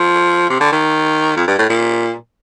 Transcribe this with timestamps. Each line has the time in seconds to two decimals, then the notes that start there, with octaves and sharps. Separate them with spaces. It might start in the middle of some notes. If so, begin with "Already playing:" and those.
Already playing: F3
0.50 C3
0.60 D3
0.72 D#3
1.36 F2
1.47 G2
1.58 A2
1.69 A#2